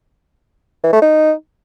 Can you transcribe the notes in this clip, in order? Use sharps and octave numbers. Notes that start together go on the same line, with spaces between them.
E3
A3
D#4